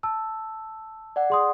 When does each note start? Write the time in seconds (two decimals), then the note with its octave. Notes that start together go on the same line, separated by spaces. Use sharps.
0.03 A5 E6
1.16 D5 F#5
1.30 G#4 C6 D#6